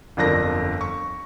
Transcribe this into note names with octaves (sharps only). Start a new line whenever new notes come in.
G1 F2 D4 A#4 A#6
C#6